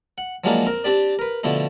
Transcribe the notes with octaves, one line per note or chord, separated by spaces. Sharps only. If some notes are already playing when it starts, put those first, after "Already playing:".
F#5
F3 F#3 G#3 A#3 D4 E4
C4 A#4
C4 D4 G4 D5
A#4 B4
B2 D3 F3 A3 E4